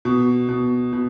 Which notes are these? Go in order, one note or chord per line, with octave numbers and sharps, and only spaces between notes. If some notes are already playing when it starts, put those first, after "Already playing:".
B2
B2
B2